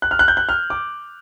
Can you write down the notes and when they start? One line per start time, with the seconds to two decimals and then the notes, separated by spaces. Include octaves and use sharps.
0.02 F#6
0.11 F6
0.19 F#6
0.28 G6
0.37 F#6
0.49 F6
0.70 D6